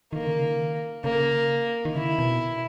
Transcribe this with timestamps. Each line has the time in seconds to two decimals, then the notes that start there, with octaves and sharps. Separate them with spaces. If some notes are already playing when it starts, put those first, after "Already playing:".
0.13 D#3 A#3
0.26 C#3
0.39 D#3
1.04 C#3 A#3
1.85 D#3
1.95 C#3 E4
2.19 B2